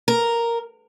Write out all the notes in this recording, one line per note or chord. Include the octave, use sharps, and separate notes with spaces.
A#4